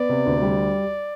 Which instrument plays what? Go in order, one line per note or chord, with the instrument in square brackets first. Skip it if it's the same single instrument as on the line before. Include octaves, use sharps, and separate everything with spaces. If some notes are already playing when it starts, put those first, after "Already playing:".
Already playing: [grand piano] B3 [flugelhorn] D5
[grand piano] C3
D2
G3